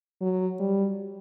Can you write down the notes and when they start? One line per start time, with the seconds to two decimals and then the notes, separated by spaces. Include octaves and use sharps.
0.21 F#3
0.60 G3